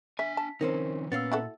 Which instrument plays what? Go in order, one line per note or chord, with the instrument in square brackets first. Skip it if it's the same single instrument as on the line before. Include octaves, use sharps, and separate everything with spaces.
[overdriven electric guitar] D4 G#5 [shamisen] E5 [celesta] B6
[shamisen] A5
[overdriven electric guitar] D#3 F3 [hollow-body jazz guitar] C4 C#4 D#4 [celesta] A#4 C5
[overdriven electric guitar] A#2 [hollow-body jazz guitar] B3 C#4 F5 [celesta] E6 A6
[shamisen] E4 F#4 A4